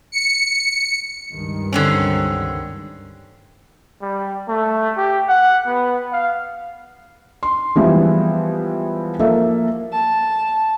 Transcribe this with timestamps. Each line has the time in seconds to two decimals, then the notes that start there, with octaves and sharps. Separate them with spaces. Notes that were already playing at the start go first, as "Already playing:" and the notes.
0.12 C#7
1.33 C#2 G2 D#3
1.73 D3 C4 C#4
4.01 G3
4.48 A3
4.97 G4
5.29 F#5
5.67 B3
6.12 F5
7.43 C6
7.76 E3 F3 G3 G#3 B3 E4
9.19 F3 A#3 A4 E5
9.92 A5